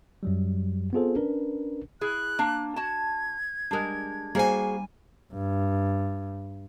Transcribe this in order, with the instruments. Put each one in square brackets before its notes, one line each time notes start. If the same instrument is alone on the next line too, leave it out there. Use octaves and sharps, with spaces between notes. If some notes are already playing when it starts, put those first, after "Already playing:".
[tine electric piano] F#2 F#3 G3
B3 C4 F4 G#4 A4 C5
C#4 D4 A#4 B4
[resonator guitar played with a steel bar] E4 G#4 [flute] F#6
[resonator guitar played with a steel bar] A#3 D4
[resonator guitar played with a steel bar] F#4 A5 [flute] G#6
[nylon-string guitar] G3 A#4 [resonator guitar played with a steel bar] G#3 D4
[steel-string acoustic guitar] G3 G#5 [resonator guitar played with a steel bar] A#3 [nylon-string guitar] F#4 G#4 C5
[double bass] G2